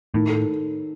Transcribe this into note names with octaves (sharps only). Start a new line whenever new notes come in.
A2 D#3
A4